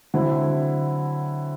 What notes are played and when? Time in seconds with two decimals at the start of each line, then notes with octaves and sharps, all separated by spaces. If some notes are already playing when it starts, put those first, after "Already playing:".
0.14 D3 F#3 C4 E4